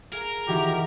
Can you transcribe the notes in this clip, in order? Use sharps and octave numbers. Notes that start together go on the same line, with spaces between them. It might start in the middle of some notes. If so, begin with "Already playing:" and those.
G#4 A#4 F5
D#3 E3 F#4 G4